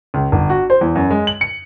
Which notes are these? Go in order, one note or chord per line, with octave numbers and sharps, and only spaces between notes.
C#2
G1
F#4
C5
E2
F#2
G#3
F#7
C#7